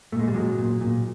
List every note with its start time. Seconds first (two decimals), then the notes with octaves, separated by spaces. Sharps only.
0.12 A#2 A3
0.19 G#3
0.28 G3
0.34 A#2 F#3 G#3
0.59 A#2
0.81 A#2